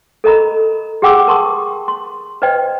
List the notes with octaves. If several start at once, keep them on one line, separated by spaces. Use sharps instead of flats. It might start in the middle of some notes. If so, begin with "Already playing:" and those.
A4 A#4 D#5 A#5 B5
G4 G#4 F#5 G5 D6 E6
A#4 A5 C6 C#6 D#6
C6
B4 C5 D5 D#5 G5